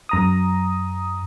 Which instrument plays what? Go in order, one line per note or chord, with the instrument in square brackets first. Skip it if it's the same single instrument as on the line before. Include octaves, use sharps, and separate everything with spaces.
[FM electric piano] F#2 A#5 D#6